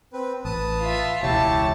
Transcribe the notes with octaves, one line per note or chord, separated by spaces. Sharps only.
C4 B4
A1 B4 A5 D#6
F4 E5
E1 C#2 G#3 E4 G4 C#5 A5